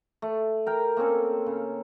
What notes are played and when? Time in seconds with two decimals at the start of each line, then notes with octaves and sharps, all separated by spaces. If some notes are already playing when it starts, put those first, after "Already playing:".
0.22 A3
0.66 A#4 G5 A#5
0.97 A#3 C4 C#4 A4
1.46 C#3